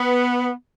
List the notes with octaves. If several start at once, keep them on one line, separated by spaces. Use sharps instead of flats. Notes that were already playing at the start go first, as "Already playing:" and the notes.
Already playing: B3